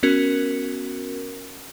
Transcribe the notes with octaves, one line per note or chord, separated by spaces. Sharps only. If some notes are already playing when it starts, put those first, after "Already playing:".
B3 C#4 F#4 A#4